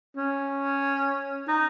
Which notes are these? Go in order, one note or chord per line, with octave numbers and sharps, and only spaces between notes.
C#4
D#4